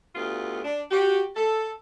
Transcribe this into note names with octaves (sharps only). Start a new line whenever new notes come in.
D2 D3 B3 F4 G4
D4
F#4 G4
A4